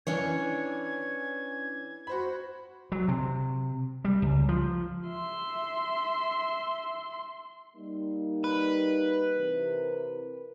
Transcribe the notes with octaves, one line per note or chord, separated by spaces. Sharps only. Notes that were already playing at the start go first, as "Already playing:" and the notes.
E3 C#4 D4 C#5 G#6
F#4 C5 B5
F#3
C3
G3
C#2
F3
E5 C6
G3 A#3 D#4
B4
C3 E3 A#4